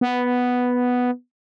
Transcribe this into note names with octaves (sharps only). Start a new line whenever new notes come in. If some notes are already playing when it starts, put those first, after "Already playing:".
B3